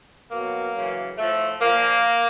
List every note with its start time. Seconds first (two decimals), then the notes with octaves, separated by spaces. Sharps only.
0.31 B2 F#3 A#3
0.74 F#2 C#3 E3
1.17 A2 F3 A3
1.60 A#2 F3 A#3